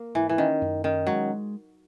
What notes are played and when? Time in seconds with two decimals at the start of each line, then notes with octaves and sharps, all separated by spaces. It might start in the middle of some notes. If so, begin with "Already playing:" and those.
Already playing: A#3
0.15 G#2 E3
0.29 E3
0.38 D#3 C#4
0.61 F#2
0.84 D#3 C#4
1.07 F#3 G#3